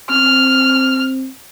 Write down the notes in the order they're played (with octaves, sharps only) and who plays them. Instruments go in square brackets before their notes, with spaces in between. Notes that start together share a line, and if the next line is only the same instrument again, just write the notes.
[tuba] C4 [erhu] F6